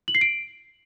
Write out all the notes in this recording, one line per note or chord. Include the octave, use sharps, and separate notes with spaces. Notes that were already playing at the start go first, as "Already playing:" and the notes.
F#7
C7
D7